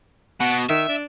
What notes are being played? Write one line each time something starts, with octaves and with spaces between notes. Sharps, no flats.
B2 F#5
D#3 E5
D4